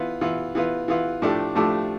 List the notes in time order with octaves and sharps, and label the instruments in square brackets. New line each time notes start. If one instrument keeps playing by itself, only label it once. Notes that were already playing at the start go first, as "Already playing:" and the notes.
Already playing: [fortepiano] E3 B3 F4
E3 B3 F4
E3 B3 F4
E3 B3 F4
A2 F3 A3 D4 G4
A2 F3 A3 D4 G4